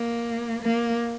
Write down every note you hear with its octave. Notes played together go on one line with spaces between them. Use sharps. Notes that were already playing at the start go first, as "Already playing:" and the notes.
Already playing: A#3
A#3